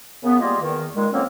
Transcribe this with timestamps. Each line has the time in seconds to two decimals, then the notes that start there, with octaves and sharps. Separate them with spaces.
0.24 C#3 A#3 B3
0.40 G3 G#3 A#3 F4 D#5
0.61 E2 D#3
0.95 A#2 D#3 G#3
1.13 F2 F#3 A#3 C4 C#4